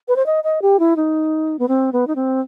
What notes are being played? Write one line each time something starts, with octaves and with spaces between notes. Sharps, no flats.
B4
C5
D#5
D#5
G4
E4
D#4
B3
C4
B3
D#4
C4